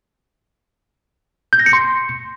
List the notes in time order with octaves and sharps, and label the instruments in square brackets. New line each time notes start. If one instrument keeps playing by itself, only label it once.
[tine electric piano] G6
A#6
C#7
C6